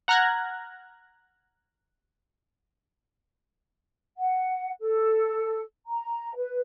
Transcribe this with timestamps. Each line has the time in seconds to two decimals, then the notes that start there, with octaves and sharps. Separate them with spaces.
0.08 F#5 A#5 F6 F#6 G#6 A#6
4.17 F#5
4.80 A4
5.86 A#5
6.36 B4